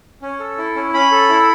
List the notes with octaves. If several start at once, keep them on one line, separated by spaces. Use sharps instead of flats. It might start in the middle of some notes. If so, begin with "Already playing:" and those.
C#4
A4
E4
C#4
C#4 B5
A4
E4